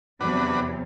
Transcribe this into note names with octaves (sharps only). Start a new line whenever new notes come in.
E2 C3 F#3 D4 F#4 B4